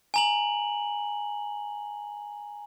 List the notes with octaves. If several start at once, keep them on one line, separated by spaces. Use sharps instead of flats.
G#5 A#5 F#7